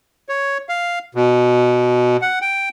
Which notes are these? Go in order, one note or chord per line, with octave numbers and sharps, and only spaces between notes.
C#5
F5
B2
F#5
G5